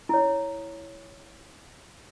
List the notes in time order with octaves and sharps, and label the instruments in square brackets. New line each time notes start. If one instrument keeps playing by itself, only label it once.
[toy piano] E4 C#5